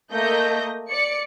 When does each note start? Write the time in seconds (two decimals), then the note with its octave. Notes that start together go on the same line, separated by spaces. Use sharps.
0.12 A3 A#3 D#5 G6 A#6
0.89 D5 C#7